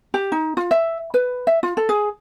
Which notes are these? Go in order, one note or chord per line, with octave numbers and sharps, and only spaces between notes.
G4
D#4
F4
E5
B4
E5
F4
A4
G#4